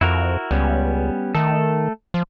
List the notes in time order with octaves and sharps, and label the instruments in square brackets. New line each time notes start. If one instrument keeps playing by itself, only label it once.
[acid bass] F2 [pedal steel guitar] E4 F#4 A#4
[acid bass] C#2 [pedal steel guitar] G3 B3 C#4
[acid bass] D#3 [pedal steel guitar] A3 A4
[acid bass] F3